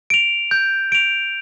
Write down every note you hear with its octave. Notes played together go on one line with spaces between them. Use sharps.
D7 F7
G6
D7 F7